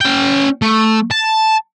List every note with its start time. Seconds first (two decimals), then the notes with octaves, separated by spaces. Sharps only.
0.01 C#4 G5
0.62 A3
1.11 A5